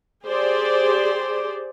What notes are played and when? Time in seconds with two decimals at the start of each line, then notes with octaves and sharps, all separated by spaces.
0.24 G4 G#4 C5 D5